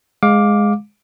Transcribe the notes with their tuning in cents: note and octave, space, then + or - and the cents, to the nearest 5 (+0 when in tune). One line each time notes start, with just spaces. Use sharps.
G#3 +0 F5 +20 D6 +0